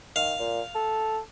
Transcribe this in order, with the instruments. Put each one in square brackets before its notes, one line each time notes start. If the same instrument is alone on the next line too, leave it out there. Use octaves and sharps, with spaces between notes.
[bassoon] D#3 [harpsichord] F5
[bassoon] A#2
A4